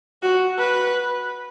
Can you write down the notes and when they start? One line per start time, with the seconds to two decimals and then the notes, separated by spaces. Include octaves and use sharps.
0.22 F#4
0.58 B4